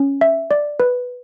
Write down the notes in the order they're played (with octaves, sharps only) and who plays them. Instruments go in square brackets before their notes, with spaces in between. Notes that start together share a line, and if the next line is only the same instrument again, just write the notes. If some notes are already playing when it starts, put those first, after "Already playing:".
Already playing: [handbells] C#4
E5
D5
B4